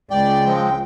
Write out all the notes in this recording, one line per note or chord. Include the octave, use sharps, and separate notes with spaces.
C#2 D5 G5
F3 G#3 C4